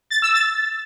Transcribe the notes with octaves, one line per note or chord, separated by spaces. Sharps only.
A6
E6
A6